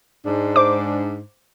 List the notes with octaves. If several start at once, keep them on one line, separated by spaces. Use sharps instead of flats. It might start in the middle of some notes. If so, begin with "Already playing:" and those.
G#2 D4
C5 D6